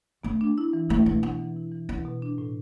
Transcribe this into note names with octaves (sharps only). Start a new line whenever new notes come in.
A3 B3
D4
E4
E3
A3 E4
B2 A3
B3 D4
E3
E4
E3
B3 E4
B2
D4
A2